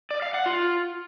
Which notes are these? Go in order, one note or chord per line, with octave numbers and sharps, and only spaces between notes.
D5
F5
F#5
F4